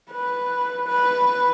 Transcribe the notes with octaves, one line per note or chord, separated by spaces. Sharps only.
B4
B4